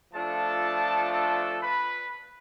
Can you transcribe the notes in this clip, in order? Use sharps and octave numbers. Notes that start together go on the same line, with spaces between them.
F3 A3 D4 F4 A4 A5
A4 A5
B4 B5